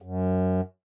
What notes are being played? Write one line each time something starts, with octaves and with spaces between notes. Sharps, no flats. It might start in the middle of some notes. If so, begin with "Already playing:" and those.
F#2